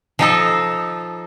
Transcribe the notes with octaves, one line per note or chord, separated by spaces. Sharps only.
F3 D#4 A4